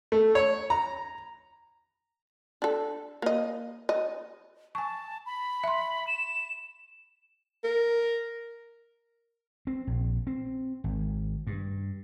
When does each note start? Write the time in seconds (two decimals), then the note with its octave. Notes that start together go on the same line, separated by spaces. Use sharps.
0.12 A3
0.35 C#5
0.70 A#5
2.62 D4 A4
3.22 A#3 D#5
3.89 D#5
4.75 G#5 A5 C#6
5.26 B5
5.64 E5 C6
6.07 E7
7.64 A#4
9.67 C4
9.87 A#1
10.27 C4
10.84 G#1
11.47 G2